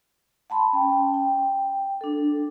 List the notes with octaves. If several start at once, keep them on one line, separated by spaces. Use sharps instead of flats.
F#5 A5 B5 C6
C#4 G5
G5
D4 A4